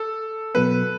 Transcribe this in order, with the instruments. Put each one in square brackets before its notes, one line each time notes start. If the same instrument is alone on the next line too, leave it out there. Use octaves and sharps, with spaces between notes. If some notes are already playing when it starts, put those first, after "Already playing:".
Already playing: [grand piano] A4
[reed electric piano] B2 F#3 B3 [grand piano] B4